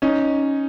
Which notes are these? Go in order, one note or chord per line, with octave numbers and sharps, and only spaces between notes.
C#4 D#4